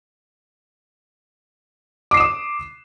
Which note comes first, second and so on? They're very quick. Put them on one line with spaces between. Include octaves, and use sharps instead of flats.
D6 C7 E7 D#6